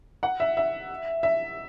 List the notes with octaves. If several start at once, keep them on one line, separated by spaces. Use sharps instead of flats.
F#5
E5
E5
E5